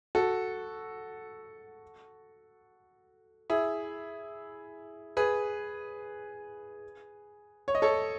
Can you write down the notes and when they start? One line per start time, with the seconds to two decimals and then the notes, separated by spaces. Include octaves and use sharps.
0.15 F#4 A4
3.50 E4 G#4
5.17 G#4 B4
7.68 C#5
7.75 D#5
7.82 A4 C#5